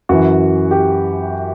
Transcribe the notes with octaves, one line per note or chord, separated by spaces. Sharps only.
F#2 E3 F#4
G4